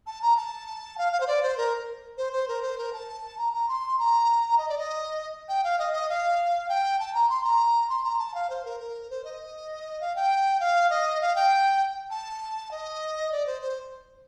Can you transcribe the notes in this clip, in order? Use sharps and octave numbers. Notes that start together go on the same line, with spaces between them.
A5
A#5
A5
F5
F5
C5
D5
C5
A#4
C5
C5
A#4
C5
A#4
A5
A#5
A#5
C6
A#5
D#5
D5
D#5
G5
F5
D#5
D#5
F5
G5
A5
A#5
C6
A#5
C6
A#5
A5
F5
C5
A#4
A#4
C5
D#5
F5
G5
F5
D#5
F5
G5
A5
D#5
D5
C5
C5